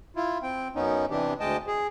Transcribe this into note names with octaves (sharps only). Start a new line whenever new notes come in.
E4 F4
C4 G5
F#2 B3 C#4 D#4
C3 E3 D4 G4
D2 G#3 D#5 G5 A5
G#4